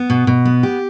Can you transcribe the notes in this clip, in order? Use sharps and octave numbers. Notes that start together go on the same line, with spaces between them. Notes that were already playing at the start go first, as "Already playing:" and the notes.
Already playing: B3
B2
B2
B3
G4